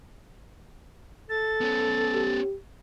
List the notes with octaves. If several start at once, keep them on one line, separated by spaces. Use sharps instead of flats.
A4 A6
B3 C#4
G4